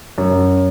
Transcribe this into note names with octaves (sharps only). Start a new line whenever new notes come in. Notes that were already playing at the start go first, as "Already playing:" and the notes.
F#2